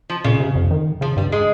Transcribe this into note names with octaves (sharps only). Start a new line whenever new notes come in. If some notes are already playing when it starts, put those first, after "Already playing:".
F3
A#2 C#3
C3
F2
D#3
C#3 F3
G2 G3
G#3